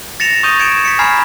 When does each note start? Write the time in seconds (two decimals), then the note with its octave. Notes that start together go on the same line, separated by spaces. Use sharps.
0.20 A6 A#6 C#7 E7 F7
0.43 C#6 D#6 G6 D#7 F7
0.59 G#6 C#7 D7 E7
0.85 B6 C#7
0.99 G#5 A#5 B5 F6 G#6 C7